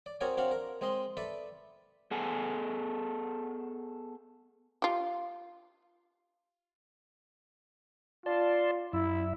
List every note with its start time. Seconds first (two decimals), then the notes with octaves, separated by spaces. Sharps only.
0.06 D5
0.21 C4 F#4 G#4 A#4 C#5 D5
0.37 C4 D4 F#4 F5 F#5
0.51 A#4
0.81 G#3 C4 D#5 C6
1.17 A4 B4 D5 E5
2.11 B3 G#4 A4 F#5 G#5
4.82 F4 G4
8.26 F4 D5 A5 C6
8.93 F#2 E4 E5